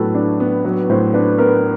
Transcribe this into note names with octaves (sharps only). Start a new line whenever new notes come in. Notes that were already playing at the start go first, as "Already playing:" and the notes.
Already playing: A2 F#3 B3 D4 A4 B4
D4
B3
F#3 B4
A2 C5
D4 B4
B3 A#4